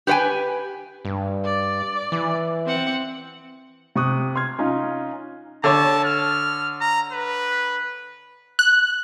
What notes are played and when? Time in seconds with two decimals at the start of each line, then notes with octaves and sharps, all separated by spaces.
0.07 G4 B4 C5 G5 G#5
1.05 G2
1.45 D5
2.12 E3
2.66 C4 F#5
3.95 C3 C#6 D#6 F#6
4.35 C6 F6 G#6
4.59 C#4 D#4 F4
5.64 D3 C#5 A5
6.05 F6
6.81 A#5
7.12 B4
8.59 F#6